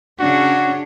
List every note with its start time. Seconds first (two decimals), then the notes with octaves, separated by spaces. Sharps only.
0.19 C#3 C#4 D4 F#4